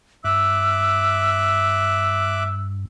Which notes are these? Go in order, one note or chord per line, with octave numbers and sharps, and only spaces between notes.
G2 E5 D6 E6 F#6